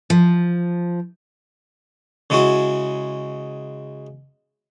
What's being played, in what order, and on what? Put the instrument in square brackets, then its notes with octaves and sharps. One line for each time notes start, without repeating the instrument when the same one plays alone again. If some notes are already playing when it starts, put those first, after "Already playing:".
[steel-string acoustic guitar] F3
[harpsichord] C#3 G#3 E4 F#4